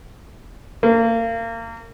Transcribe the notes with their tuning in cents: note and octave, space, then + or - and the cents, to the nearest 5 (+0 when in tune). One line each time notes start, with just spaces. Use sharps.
A#3 -30